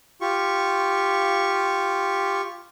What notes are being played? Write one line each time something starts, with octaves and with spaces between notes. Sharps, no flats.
F4 G4 C#6